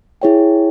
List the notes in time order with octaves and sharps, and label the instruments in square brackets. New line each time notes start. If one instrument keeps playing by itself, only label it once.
[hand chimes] E4 G#4 C#5 G5